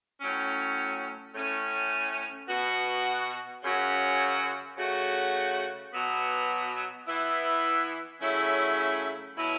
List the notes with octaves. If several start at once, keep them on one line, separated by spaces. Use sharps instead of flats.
A2 F#3 C#4
A2 A3 C#4
B2 B3 F#4
F#2 C#3 F#3 C#4 F#4
C#3 A3 F#4
B2 F#3 B3
E3 B3 E4
C#3 F#3 A3 C#4 E4
B2 F#3 C#4 E4